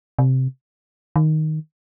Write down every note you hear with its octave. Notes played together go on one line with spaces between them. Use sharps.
C3
D#3